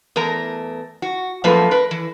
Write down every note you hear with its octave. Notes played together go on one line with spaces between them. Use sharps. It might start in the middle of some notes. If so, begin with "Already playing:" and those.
E2 A3 A#4 A#5
F#4
F#2 A#2 F3 A3 A#3 B4
A#4 B4
E3